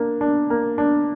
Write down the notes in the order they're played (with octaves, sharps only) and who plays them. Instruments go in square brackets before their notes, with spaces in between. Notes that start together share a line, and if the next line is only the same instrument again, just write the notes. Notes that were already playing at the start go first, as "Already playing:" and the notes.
Already playing: [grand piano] A#3 D4
D4
A#3
D4